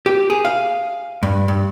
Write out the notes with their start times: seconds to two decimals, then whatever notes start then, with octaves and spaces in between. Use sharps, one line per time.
0.06 G4
0.30 G#4
0.45 F5
1.23 G2
1.48 G2